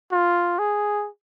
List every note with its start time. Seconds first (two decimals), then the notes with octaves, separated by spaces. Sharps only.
0.12 F4
0.59 G#4